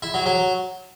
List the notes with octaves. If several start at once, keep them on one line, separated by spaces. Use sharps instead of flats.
E4
F#3
F#3